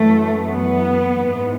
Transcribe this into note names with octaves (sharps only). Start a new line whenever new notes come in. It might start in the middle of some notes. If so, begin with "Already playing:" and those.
Already playing: F#2 E3 A3
B3
G#2 E3